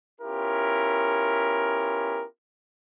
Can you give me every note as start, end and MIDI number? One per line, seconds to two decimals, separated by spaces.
0.21 2.24 59
0.21 2.24 61
0.21 2.24 64
0.21 2.24 65
0.21 2.24 67
0.21 2.24 70